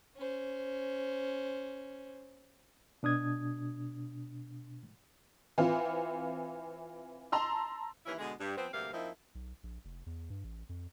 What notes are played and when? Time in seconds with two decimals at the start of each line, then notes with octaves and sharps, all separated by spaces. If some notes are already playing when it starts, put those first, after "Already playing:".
0.17 C#4 C5
3.03 B2 D4 D#6 G#6
5.58 E3 C4 F4
7.32 A5 A#5 C6 E6
8.06 D#2 E3 C#4 E4
8.18 B2 D3 G#3
8.41 G2
8.56 F3 B3 C4
8.73 D2 G2 C3 A#3 F5
8.93 F3 A#3 C4 D#4 E4
9.35 B1
9.63 A#1
9.85 F1
10.06 E2
10.30 G2
10.44 A1
10.69 F2